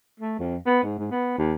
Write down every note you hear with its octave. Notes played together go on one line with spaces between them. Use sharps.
A3
F2
B3
G#2
G#2
B3
D#2